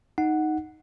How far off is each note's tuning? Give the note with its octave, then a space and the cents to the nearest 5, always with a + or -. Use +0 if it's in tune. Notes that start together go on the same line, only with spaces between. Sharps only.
D#4 +0 F#5 +0